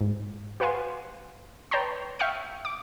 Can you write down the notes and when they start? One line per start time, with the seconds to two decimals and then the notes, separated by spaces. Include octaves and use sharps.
0.01 G#2
0.60 F#4 B4 F5 F#5 G#5 C6
1.71 B4 C#5 G5 A5 A#5 C6
2.19 E5 F5 G5 C#6 F6 C#7
2.65 D6